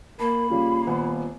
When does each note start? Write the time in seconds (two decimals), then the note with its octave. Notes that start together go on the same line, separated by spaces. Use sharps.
0.20 A#3 A#4 A5 B5
0.50 C#3 G3 F4 C#5
0.87 D#1 B3 F4 F#5